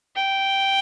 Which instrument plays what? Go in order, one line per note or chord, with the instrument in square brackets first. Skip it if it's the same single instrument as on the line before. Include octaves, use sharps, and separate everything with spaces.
[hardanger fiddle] G5